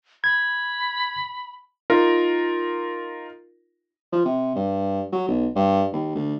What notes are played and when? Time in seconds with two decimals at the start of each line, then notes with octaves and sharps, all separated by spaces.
0.24 B5 G#6
1.90 D#4 F4 A#4
4.12 F3
4.25 C3
4.55 G2
5.12 F#3
5.28 B1
5.56 G2
5.92 D#2
6.15 D2